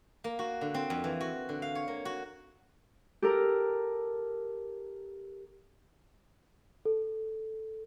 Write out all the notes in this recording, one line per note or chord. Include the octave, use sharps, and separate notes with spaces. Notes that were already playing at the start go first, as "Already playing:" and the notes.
A#3
F#4
D3
C4
F2
E3
F#4
D3
F5
C#5
A#3
F#4
G4 A4 A#4
A4